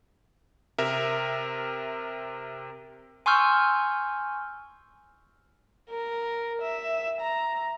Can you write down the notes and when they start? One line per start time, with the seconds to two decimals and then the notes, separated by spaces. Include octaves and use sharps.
0.78 C3 A#4 E5
3.26 G#5 C6 C#6 E6 F6 G6
5.90 A#4
6.62 E5
7.20 A#5